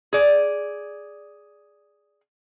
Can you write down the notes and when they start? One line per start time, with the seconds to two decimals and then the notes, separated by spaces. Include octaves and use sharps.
0.13 G#4 D5